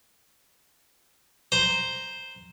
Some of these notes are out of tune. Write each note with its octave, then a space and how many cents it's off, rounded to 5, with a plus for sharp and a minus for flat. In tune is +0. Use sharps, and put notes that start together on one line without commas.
C5 +0 A#5 +0